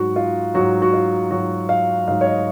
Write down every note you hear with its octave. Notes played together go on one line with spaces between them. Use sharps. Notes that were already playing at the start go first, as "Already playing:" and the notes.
Already playing: G#2 F#3 F#4
F4
G#2 F#3 F#4
F#4
F4
G#2 F#3 F#4
F5
G#2 F#3 F5
C#5
D#5